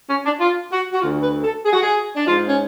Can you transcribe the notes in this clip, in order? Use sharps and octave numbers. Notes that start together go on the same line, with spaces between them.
C#4
D4
F4
F#4
F#4
D2 D3 F4
B4
A4
G#4
F#4
G#4
D4
G#2 F4
C#4